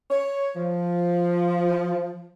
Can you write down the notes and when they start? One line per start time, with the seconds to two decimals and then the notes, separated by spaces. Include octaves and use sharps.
0.11 C#5
0.56 F3